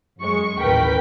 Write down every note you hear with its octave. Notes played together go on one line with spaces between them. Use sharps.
F#2 G#3 C#6
A1 D#2 A#4 B4 G5 B6